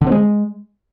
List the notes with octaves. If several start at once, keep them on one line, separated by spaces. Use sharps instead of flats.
D3
C4
G#3